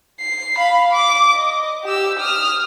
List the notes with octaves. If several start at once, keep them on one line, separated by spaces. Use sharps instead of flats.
C7
F5 B5
D6
D#5
G4 E6
D#6 F6